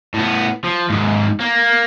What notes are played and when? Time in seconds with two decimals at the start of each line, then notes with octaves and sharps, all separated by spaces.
0.14 A2 B3
0.64 F3
0.90 D#2 G#2
1.40 A#3